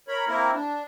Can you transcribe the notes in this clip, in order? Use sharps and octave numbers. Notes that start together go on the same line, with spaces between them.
A#4 C#5 B5
A#3 C4 E4 A#4
D4